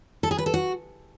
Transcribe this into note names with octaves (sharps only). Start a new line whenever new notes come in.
A4
G#4
B4
A4
F#4